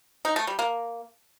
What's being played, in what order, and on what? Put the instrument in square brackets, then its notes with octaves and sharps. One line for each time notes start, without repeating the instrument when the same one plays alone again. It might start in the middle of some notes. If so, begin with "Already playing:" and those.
[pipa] D#4
A3
G3
A#3